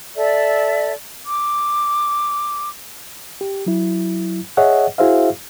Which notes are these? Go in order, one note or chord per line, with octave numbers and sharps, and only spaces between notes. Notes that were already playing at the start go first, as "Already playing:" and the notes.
A4 D5 E5
D6
G4
F#3 E4
G#4 C#5 D#5 E5 F#5
E4 F#4 G#4 C5 E5 F5